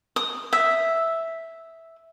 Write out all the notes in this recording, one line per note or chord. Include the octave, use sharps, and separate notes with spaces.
D#6
E5